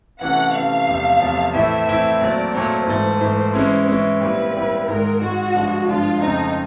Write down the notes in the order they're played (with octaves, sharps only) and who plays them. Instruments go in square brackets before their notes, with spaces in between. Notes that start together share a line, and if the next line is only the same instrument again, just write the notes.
[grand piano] C3 E3 A3 C#4 [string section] F#5
[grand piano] C3 E3 A3 C#4 [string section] F5
[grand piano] E2 C3 F3 A3
E2 C3 F3 A3
[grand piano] A2 E3 A3 C4 E4 [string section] E5
[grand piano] A2 E3 A3 C4 E4
[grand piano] A#2 F#3 A3 C4 [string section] D5
[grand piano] A#2 F#3 A3 C4 [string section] C#5
[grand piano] G#2 E3 A3 [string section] C5
[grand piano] G#2 E3 A3
E3 G#3 C#4 E4
E3 G#3 C#4 E4
[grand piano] A#2 G3 C4 E4 [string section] B4
[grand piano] A#2 G3 C4 E4
[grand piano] G#2 D#3 G#3 [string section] A#4
[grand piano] G#2 D#3 G#3 [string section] F#4
[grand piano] G2 D3 F3 G#3
[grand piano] G2 D3 F3 G#3 [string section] F4
[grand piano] F2 C#3 F3 A3 C4 [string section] D#4